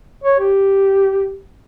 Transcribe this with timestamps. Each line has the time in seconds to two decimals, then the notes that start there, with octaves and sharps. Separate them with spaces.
0.24 C#5
0.39 G4